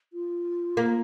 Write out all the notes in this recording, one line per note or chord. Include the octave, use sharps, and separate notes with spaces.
F4
A#3